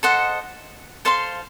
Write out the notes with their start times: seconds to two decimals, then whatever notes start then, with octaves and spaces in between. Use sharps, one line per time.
0.03 A4 C5 D#5 F#5
1.05 A4 C5 F5 C6